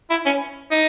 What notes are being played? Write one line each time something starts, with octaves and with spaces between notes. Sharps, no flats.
E4
C#4
D#4